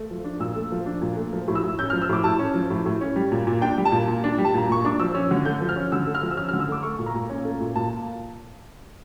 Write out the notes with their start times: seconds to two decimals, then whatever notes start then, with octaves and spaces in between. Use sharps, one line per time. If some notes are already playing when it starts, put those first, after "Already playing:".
Already playing: A3
0.10 F3
0.24 D4
0.40 A#2 E6
0.56 A3
0.72 F3
0.86 D4
1.02 A#2
1.16 A3
1.33 F3
1.48 A2
1.55 E6
1.63 A2
1.79 C#4 G6
1.90 F6
1.93 F3
2.02 E6
2.09 A2 D6
2.24 A2 A5
2.39 C#4
2.54 F3
2.70 A2
2.86 A2
3.01 C#4
3.16 G3
3.32 A#2
3.47 A#2
3.61 D4 G5
3.78 G3
3.85 A5
3.92 A#2
4.08 A#2
4.24 D4
4.38 G3
4.45 A5
4.54 A#2 A#5
4.69 A#2 C#6
4.85 D4 D6
5.00 F3 E6
5.15 C#4
5.31 D3
5.45 A3 G6
5.61 F3
5.69 F6
5.76 C#4
5.92 D3 E6
6.07 A3
6.15 F6
6.23 F3
6.31 E6
6.37 C#4 F6
6.49 F6
6.53 D3
6.60 E6
6.68 A3 D6
6.83 A3 C#6
6.99 A#2
7.06 A#5
7.14 A#2
7.30 C#4
7.45 A3
7.61 A#2
7.76 A#2 A5